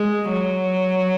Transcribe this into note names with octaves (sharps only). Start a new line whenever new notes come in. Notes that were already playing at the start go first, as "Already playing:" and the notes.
Already playing: G#3
F#3